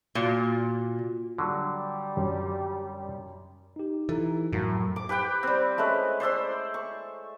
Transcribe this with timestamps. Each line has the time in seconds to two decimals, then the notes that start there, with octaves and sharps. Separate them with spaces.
0.15 A#2 F4 F#4
1.38 D3 F#3 G3
2.17 F#2
3.76 D#4 G4
4.09 E3 A4 A#5
4.52 F#2 A2 F3 F#3 F#4 A#4 A#5
4.96 D6
5.09 G4 B4 F#5 G5
5.43 G3 C4
5.78 G#3 A3 C#4 B4
6.20 C5 D5 E5 C6
6.74 C#6